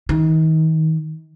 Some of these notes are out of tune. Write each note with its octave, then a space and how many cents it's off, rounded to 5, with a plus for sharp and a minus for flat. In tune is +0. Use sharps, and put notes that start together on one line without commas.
D#3 +35